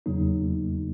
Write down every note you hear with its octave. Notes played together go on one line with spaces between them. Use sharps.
E2 C#3 F#3 A#3 D#4